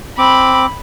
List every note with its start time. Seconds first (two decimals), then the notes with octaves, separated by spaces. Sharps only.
0.18 C4 B5 D6